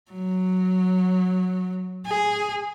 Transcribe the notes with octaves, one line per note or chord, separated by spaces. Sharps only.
F#3
G#4